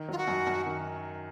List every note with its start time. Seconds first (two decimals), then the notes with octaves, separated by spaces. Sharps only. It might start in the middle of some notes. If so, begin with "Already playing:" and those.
Already playing: D#3
0.08 F#3 F4
0.18 F#4
0.28 F#2
0.47 F#2
0.66 D#3